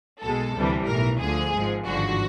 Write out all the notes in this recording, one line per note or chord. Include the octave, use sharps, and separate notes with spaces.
B1 B2 G#3 A4
D2 C3 E3 G3
B1 A2 E3 A#4
D2 D3 F3 G#4
G#1 G#2 F3 G#3
G#1 G2 D3 F3 F#4